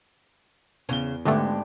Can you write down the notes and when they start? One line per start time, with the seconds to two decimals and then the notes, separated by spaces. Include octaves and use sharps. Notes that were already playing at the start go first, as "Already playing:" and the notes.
0.89 E2 C#3 C#4 G7
1.25 G#1 D3 G#3 A3 B3 D4 G4 F#5